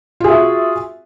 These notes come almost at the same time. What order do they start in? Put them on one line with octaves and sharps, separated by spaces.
F4 G#4 E5 F#4